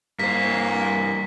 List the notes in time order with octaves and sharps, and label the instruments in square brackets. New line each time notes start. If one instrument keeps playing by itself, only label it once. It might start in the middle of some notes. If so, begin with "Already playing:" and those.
[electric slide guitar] G2 C5 [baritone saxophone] A#3 [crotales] B6